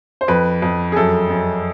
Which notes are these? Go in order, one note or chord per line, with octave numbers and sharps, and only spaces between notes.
C5
F2 B4
F2
G#4
F#2 A4
F#2